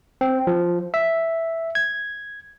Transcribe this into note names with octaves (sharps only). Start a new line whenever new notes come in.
C4
F3
E5
G#6